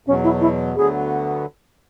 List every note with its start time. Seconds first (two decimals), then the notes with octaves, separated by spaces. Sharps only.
0.07 E2 B2 F#3 C#4
0.24 E4
0.41 E4
0.76 D2 D3 F#3 B3 G#4